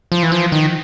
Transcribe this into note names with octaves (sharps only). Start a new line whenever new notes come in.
F3
E3
F3
D#3